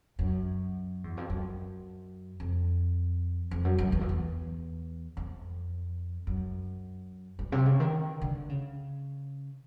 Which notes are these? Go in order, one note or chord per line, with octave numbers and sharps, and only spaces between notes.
F#2
E2
F2
F#2
F2
F2
F#2
F#2
E2
F2
E2
F2
F#2
G2
C3
C#3
D#3
D3
C#3